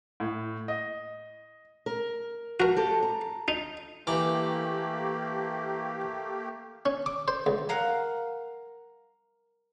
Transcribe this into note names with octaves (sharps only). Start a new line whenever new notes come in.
A2
D#5
A#4
F3 F#4 A#4
G4 A4 C5
A#5
D#4
E3 A3 A#3 G4 A#5 D6
C#4
D6
C5
C#2
A#4 F5 F#5